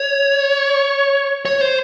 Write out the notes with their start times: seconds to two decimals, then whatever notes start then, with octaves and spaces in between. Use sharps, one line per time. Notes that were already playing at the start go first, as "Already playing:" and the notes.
Already playing: C#5
1.45 C#5
1.61 C5